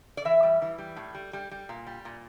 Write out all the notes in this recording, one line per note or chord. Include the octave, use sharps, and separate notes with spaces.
D5
E3 E5
G3
E3
G3
A2
G3
G3
G3
A#2
G3
A#2